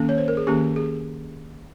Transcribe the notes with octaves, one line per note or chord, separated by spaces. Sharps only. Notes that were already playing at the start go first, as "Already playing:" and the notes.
Already playing: D#3 A#3 C#4
C#5
C5
A#4
G#4
D#3 A#3 C#4 G4
G#4